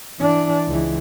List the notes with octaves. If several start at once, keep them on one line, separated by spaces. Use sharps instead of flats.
E3 D4
C#2 E3